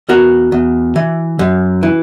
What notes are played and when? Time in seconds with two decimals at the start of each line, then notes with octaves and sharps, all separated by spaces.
0.09 E2 F#4 A#4
0.52 E2
0.96 E3
1.39 F#2
1.83 E3